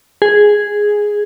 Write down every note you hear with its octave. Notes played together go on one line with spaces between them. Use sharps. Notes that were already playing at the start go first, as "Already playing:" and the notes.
G#4